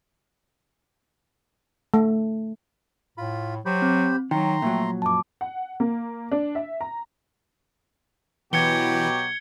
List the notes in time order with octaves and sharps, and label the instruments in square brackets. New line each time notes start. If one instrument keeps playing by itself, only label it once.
[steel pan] A3
[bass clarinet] A2 [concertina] F4 B5
[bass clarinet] F#3 [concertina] G4 C5 B5
[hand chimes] C4
[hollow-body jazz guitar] D#3 [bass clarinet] F#3 [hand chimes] G5 [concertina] A#5 C6
[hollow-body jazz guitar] A#2 F3 F#3 [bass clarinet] A3
[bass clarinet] F#2 [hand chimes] A5 D6
[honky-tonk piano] F#5
A#3
D4
E5
A#5
[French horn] B2 [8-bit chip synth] E3 [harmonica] F#3 G4 [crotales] G#6 C#7 G7